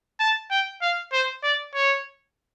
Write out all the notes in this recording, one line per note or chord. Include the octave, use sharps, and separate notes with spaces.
A5
G5
F5
C5
D5
C#5